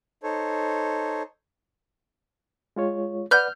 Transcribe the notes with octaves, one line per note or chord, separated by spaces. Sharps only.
D#4 A4 C5 C#5
G#3 F4 C#5
B4 D5 F#5 F6 G6